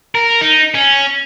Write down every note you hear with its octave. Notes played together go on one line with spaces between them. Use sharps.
A#4
D#4
C#4